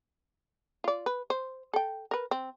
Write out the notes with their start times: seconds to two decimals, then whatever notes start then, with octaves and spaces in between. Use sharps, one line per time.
0.84 F4 D5
1.06 B4
1.30 C5
1.73 A4 G5
2.11 A#4 B4
2.31 C4